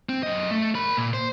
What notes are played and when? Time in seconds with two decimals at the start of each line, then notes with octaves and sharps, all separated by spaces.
0.09 C4
0.23 F#2 D#5
0.51 A3
0.75 A#4 B5
0.97 A#2
1.13 C5